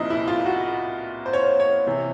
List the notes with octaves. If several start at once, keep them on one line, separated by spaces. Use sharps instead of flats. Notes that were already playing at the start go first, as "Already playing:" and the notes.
Already playing: C2 A#2 F3 D#4 E4
E4
F4
F#4
C5
C#5
C#5
C3 E3